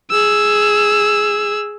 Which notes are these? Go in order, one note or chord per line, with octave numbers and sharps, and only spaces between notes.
G#4 E6